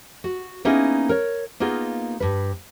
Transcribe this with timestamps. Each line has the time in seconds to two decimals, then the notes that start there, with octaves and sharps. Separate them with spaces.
0.24 F#4
0.65 A#3 B3 C#4 D#4 E4 G#4
1.09 A#4 C#5
1.60 A#3 B3 D#4 F4 G#4
2.20 G2 B4